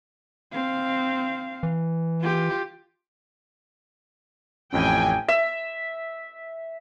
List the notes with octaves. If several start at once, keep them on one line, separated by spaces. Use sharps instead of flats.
C4 F5
E3
F4 G4
A1 F2 C#4 G5 G#5
E5